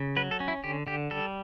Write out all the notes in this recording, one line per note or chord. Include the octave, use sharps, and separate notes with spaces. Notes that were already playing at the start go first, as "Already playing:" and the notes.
Already playing: C#3
F#3 B4
A4
C#4
E4
D3 G4
D3 G4
G3 A4